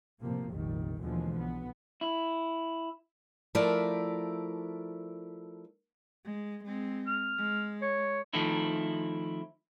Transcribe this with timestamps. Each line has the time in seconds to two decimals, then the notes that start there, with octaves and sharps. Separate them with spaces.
0.22 A2 C3 F3 A#3
0.52 F1 A#1 D#3 G3
1.01 D#2 B2 D3 E3 F3 G#3
1.36 B1 B3
2.01 E4
3.55 F3 A3 E4 A#4 D5
6.25 G#3
6.64 G#3 C4
7.07 F6
7.38 G#3
7.82 C#5
8.33 D#3 F3 A3 C4 D#4 E4